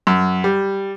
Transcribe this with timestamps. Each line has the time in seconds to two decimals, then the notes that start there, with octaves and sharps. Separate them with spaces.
0.07 F#2
0.44 G3